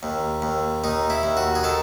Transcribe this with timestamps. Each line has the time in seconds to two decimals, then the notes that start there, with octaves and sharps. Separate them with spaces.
0.03 D#2
0.42 D#2
0.84 D#2 D#4
1.10 E4
1.23 D#2
1.37 F#4
1.55 G#4
1.63 D#3 A4